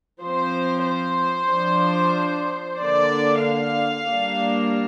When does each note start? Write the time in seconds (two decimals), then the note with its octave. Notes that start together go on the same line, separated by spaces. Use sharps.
0.21 F3 C4 C5
0.85 C5
1.49 F3 D4
2.77 D3 A#3 D4 D5
3.42 F5
4.06 G3 A#3 D4